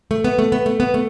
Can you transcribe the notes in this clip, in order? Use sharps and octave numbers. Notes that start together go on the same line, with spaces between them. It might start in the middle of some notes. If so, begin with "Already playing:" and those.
A3
B3
A3
B3
A3
B3
A3